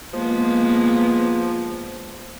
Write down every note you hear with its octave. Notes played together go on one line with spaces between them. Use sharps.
F3 G#3 A#3 B3